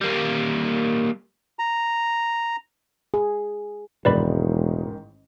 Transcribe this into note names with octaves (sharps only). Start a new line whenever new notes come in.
G3 A#3
A#5
G#4
E1 A1 G#2 D#3 B4 D5 B5